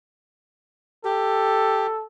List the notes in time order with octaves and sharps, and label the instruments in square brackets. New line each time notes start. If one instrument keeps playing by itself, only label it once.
[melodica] G4 [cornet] A4